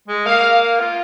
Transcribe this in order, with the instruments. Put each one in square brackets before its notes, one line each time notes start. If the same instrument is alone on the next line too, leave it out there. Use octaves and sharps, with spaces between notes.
[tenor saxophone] G#3
[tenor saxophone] A#3 [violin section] F5
[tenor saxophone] F4